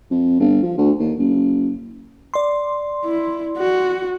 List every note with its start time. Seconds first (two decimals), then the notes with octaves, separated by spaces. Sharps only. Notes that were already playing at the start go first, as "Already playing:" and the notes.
0.10 F2
0.40 G1
0.62 F3
0.78 D2
1.00 D#2
1.19 F#1
2.34 D5 C6
3.05 E4
3.58 F#4